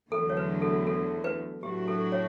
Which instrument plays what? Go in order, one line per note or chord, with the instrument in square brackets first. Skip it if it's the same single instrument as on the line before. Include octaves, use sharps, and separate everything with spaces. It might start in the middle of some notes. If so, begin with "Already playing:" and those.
[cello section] E2 D3 F#3 A3 [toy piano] A4
[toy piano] C#5
B4
A4
A4
B4
[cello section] A2 F#3 A3 D4 F#4 [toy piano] G4
[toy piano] A4
C#5